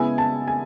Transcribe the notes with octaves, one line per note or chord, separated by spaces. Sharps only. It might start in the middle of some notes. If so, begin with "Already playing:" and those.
Already playing: C#3 G#3 B3 E4 G#5
A5
G#5